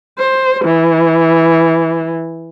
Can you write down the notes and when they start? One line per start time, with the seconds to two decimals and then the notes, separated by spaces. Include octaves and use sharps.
0.18 C5
0.65 E3